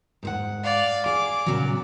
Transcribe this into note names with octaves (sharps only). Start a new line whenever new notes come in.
G#2 C5 F#5
D5 F5
G#4 D6
A#2 C#3 F#3